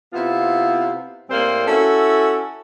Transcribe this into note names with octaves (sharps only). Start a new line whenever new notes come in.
C3 B3 E4 F4
A2 G3 A#3 C4 C5
C#4 E4 F#4 A4